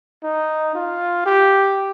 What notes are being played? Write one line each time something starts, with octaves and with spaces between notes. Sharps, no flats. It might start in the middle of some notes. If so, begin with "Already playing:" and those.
D#4
F4
G4